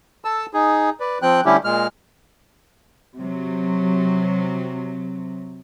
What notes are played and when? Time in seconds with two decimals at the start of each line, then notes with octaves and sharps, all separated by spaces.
0.25 A4 A5 E6
0.54 D#4 G#4
1.00 B4 D5
1.22 F3 C4 G5 F#6
1.45 D3 G3 A3 C#4 E4 G4
1.64 A#2 G#3 F6
3.18 C3 F#3